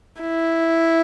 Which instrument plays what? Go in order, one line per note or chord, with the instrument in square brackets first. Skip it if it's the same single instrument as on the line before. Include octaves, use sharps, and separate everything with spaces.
[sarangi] E4